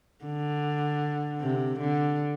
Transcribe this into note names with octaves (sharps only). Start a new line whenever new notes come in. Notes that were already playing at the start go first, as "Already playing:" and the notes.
D3
C3
D3